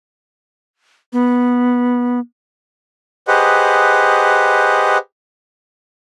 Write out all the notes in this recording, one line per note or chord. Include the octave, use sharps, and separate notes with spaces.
B3
G4 G#4 B4 C5 D#5 F#5